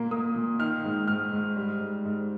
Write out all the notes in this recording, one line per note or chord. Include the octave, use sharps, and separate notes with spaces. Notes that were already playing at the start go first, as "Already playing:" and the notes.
Already playing: A#2 A#3
A#3 D#6
A#2
D#3 F6
G#2
G#2 F6
G#2
G3
G#2
G#2